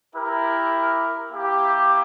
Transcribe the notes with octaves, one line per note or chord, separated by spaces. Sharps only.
E4 G4 A#4
A#3 E4 G4